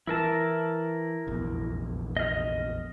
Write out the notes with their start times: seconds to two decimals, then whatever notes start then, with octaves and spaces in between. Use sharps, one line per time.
0.07 E3 E4 A#4 A5
1.27 F1 A#1 E2
2.17 D#5 F6